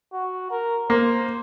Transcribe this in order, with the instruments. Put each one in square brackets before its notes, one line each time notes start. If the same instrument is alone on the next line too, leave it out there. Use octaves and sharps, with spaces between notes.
[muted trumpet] F#4
A#4
[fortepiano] A#3 [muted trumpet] C5